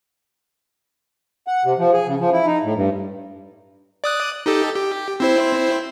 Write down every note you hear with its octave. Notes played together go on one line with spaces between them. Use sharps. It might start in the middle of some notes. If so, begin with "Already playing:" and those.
F#5
C3
F3
G#4
C#3
F3
E4
D#4
A2
G2
D5 D#6 F#6
D#4 G4 A4
G4
C4 E4 C5